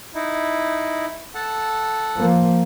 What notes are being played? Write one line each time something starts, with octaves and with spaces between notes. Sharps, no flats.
D#4 E4
A4 F#5 A5
F3 A#3